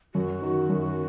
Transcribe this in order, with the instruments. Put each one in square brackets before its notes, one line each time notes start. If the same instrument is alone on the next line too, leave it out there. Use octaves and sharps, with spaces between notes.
[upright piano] F#2 [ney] F#4
[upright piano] D#3
F#2